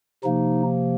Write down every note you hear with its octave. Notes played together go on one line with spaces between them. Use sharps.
C3 F3 A#3 D#4